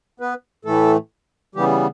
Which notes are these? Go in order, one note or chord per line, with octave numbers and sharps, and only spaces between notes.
B3 B4
A2 E3 A3 A4
C#3 E3 G3 B3 G4